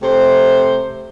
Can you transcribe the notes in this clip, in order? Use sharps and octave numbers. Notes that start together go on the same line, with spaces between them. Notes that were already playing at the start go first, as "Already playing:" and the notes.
C3 A3 C5